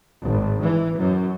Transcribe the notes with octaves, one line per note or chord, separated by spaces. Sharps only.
G#1
E3
F#2